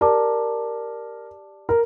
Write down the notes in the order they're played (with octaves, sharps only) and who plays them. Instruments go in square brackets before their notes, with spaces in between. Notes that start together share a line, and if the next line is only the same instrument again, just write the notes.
[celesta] G4 D5 A5 D6 [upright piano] A#4
[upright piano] A#4